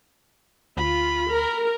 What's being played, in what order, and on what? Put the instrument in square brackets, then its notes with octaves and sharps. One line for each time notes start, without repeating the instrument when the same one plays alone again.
[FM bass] D2 [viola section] F4 [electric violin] B5
[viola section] A#4